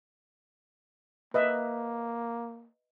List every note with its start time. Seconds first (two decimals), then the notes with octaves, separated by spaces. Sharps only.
1.34 A#3 B4 D#5 E5